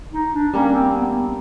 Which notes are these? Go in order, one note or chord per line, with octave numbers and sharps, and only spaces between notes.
D#4
D4
G3 A#3 C#4 D4
C4
B3